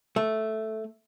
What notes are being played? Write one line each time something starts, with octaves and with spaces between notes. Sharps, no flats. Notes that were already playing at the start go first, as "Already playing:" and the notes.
A3